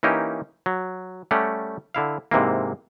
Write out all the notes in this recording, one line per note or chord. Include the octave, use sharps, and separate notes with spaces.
E3 A#3 C#4 D#4 G4
F#3
G3 A3 C#4 G4 F#5
D3 E4 F5
G#2 C3 E3 A#3